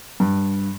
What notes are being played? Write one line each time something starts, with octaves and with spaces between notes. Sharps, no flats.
G2